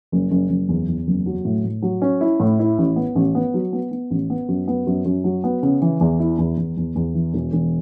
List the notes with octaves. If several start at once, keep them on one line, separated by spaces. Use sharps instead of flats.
F#1
F#1
F#1
E2
E2
F#1
F#3
A2
A2
F#3
C#4
E4
A2
E4
A1
B3
A1
B3
F#3
B3
B3
A1
B3
F#2
B3
F#2
F#2
F#3
B3
C#3
E3
E2
E4
E2
E2
E2
E2
E3
E1
E1